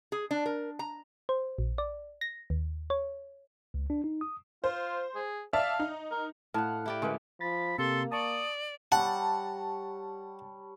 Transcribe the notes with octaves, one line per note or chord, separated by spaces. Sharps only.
G#4
D4
A#4
A#5
C5
A#1
D5
A#6
D#2
C#5
C#2
D4
D#4
D#6
F4 C5
G#4
D5 E5 F5 A5
D#4
A#4
A2 F5 F#5 A5
E4 G4 D5
D3 G#3 C#4 A#4 B4
F3 B5 A6
C3 A#3 G4 A4 C6
D5 A5 C#6 D#6
G3 C#5 F#5 A5 A#5